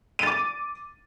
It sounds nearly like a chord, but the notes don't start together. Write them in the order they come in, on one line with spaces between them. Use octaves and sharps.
D#7 A6 D6